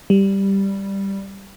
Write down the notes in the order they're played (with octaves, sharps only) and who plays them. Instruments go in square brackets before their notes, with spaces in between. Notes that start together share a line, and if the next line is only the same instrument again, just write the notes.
[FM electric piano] G3